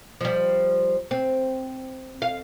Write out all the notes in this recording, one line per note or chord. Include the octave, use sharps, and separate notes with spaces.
F3 G3
C4
F5